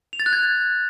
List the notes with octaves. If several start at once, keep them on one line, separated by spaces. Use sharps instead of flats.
F7
A6
F#6
G#6